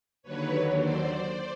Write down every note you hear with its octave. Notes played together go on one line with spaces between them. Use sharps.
D#2 D3 F#3 B4 C#5
C5 D5